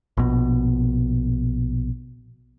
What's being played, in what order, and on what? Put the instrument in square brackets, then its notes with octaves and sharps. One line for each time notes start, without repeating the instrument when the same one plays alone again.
[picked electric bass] A#1 B2